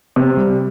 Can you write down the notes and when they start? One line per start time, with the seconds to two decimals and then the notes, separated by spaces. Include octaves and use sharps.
0.16 C3
0.37 G3